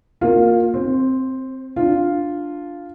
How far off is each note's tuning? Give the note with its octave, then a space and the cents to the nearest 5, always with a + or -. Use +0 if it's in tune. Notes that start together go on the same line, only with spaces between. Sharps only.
A#3 +0 F4 +25
C4 +0 C5 +30
D4 +0 F4 +0